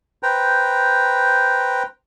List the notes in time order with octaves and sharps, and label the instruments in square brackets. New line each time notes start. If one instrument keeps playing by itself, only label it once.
[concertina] B4 C5 G5 A#5